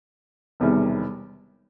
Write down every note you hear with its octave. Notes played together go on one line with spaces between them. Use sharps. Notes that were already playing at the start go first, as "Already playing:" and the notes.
E1 E2 C3 D#3 G3